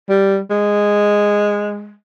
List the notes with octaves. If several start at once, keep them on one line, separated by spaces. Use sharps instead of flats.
G3
G#3